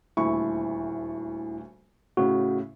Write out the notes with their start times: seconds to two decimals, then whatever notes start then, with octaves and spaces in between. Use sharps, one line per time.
0.17 D#1 D2 E4 C#6
2.17 A2 C#3 F#4